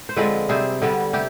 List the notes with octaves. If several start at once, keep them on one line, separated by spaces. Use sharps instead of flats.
C5
D3 F3 G#3 C4 B4 D5
C3 G3 C4 G#4 C5
D3 G3 B3
C3 G4